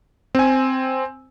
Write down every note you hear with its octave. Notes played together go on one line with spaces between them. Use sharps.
C4 G#5